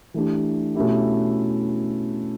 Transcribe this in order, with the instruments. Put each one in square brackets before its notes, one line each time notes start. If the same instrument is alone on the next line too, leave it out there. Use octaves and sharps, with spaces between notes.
[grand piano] E3 A3 D4 G4
B2 A3 C#4 E4 G4